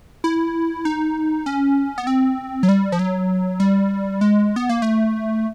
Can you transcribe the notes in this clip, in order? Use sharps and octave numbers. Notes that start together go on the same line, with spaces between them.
E4
D#4
C#4
B3
C4
F#3
G3
F3
F#3
G3
G#3
B3
A#3
A3